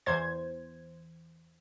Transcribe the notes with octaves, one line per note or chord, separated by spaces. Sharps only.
E2 C5 G#6